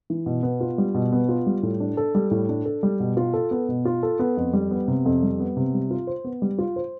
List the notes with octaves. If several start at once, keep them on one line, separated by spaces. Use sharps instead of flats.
E3
B2
B3
F4
G3
B2
B3
F4
G3
A2
D4
A4
G3
A2
D4
A4
G3
B2
F4
A4
B3
B2
F4
A4
B3
F2
G3
B3
C3
F2
G3
B3
C3
G3
F4
C5
B3
G3
F4
C5